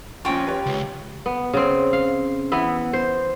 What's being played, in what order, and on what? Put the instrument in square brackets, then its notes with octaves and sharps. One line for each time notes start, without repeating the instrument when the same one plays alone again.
[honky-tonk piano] A#1 C#6 [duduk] C#4 [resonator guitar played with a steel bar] F4 G5
[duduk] G4 [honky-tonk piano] B4 C#5
[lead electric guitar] C#2
[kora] B3
C#3 C4
F5
E3 B3 E5
C5